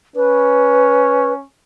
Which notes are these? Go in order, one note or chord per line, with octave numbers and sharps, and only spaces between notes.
C#4 B4